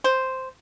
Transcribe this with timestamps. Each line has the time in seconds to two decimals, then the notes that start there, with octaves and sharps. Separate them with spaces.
0.04 C5